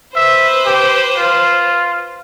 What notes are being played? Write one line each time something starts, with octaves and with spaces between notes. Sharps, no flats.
B4 C5 E5
G4
F4